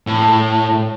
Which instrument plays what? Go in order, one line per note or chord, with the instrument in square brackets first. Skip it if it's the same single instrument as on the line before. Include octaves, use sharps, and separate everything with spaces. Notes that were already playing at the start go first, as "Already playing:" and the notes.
[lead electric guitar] A2